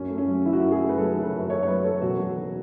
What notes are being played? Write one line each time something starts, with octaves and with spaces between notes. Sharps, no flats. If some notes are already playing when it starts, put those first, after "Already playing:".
Already playing: F#2 C#4
A3
C#4
F#3
D#3 E4
F#4
F#2 E4
G#4
A3
B4
F#3 A4
D#3
B4
F#2
A3 C#5
C#5
F#3 B4
D#3 A4
E1 F#4
F#3
D#3